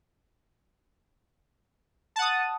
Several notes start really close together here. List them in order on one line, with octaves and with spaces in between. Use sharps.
A5 F#5 D#6